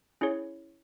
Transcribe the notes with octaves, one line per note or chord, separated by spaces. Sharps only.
C#4 E4 G#4 C#5